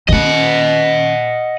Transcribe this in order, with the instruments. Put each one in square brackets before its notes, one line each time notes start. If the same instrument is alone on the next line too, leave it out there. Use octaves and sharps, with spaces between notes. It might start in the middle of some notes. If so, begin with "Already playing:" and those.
[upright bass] D#3 C#4 [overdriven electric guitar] D#5 F#5